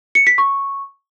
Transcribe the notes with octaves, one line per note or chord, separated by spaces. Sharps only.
C#7
B6
C#6